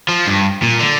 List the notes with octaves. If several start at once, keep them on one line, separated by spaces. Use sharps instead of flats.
F3
G2
A#2
D3